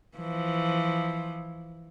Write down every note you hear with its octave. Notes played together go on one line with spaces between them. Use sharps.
E3 F3